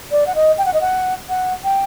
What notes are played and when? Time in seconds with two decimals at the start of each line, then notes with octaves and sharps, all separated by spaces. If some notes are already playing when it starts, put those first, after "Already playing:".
0.11 D5
0.27 F#5
0.35 D#5
0.58 G5
0.66 F#5
0.74 D#5
0.81 F#5
1.29 F#5
1.64 G5